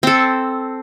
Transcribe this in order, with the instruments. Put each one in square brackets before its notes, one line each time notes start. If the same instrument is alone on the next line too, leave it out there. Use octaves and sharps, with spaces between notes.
[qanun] C4 A4